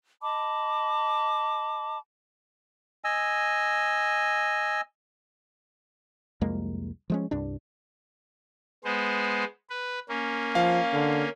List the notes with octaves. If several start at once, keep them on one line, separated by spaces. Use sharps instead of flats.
D#5 A5 B5 D6
D#5 G#5 E6
C2 F2 G#3 A#3
F3 G#3 C#4
C2 G2 D4
G#3 B3 C5
B4
A#3 C#4
F3 F5
D3